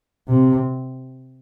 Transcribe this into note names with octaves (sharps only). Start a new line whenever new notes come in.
C3